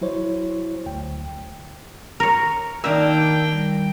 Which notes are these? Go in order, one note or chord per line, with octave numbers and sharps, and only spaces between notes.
F#3 E4 C5 C#5
D2 G5
A#4 C#5
D#3 A#3 D4 D#4 E5 G5
G3